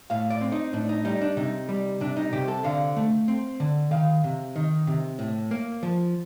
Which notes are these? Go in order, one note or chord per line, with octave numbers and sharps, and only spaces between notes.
A2 F5
D5
C4
D#4
A2 D4
D#4
G3 D#4
D4
C3 D#4
G3
C3 D4
D#4
C3 G4
A4
D3 F5
A3
C4
D3
D#3 F5
C3
D#3
C3
A2
A#3
F3